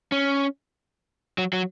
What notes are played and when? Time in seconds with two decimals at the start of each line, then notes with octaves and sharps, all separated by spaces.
0.12 C#4
1.38 F#3
1.53 F#3